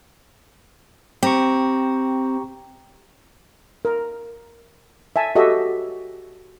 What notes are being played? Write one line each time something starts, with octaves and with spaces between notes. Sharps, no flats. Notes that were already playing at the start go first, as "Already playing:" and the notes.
C4 G4 A#5 C#6
A#4
E5 G#5 A5
F#4 G4 A4 D#5 E5